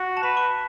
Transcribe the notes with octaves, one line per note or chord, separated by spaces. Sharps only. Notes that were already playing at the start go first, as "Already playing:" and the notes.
Already playing: F#4
A5
B4 B5
C#6